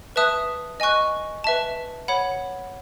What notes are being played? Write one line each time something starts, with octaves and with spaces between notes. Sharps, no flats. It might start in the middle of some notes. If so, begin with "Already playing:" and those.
B4 E5 A5 D#6 F#6
D#5 G#5 C#6 F#6
B4 E5 A5
C#5 F#5 B5